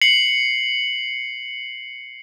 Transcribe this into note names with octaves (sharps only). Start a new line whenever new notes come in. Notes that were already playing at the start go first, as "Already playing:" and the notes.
C7 C#7 F#7